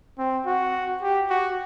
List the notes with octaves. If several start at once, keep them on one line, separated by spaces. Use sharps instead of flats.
C4
F#4
G4
F#4